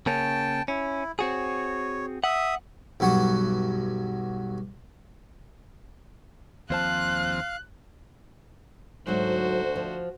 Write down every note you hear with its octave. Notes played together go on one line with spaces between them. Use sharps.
C#3 A#3 C#4 G5 A5
C#4 E4
C4 F#4 G#4 C#5
E5 F#5 D#6
B1 G2 F#3 F#4 F#5
D#2 F3 C4 C5 F5 A5 F#6
D2 G#2 F#3 F#4 C5
F3